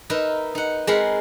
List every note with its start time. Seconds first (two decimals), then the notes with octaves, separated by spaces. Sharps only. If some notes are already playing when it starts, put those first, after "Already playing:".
0.10 D#4 A#4 B4 E5
0.55 D#4 F#5
0.87 G#3 C4 A#4 F#5 B5